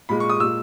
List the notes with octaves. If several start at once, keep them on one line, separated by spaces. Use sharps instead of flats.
A#2 G#3 B5
C#6
D#6
A#2 G#3 E6